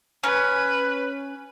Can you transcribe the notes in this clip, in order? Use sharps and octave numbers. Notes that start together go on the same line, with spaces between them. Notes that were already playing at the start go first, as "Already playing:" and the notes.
C#4 B4